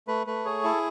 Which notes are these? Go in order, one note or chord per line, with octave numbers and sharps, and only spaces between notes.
A3 B4
A3 B4
G#4 C#5
E4 A4